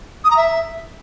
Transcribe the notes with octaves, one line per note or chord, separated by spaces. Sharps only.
D#6
A#5
E5